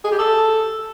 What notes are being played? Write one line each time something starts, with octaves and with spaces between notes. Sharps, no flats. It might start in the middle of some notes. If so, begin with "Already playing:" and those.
G#4
G4
A4